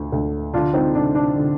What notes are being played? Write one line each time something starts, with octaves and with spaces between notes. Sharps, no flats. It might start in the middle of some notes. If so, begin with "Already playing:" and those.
Already playing: D2
D2
D3 D4 F4
C4 D#4
D3 D4
D4
D3